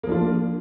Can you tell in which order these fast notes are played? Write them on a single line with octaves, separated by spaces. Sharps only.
A#3 F3 D4 F4